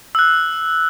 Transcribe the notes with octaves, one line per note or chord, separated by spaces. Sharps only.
E6 F#6